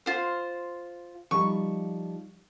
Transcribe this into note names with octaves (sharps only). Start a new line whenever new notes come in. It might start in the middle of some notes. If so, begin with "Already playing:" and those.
F4 C5
F3 G3 D#4 C#6